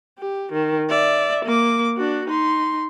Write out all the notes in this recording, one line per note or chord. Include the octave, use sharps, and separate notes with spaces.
G4
D#3
D5 E5
A#3 D6
D4 F#4
D#4 C6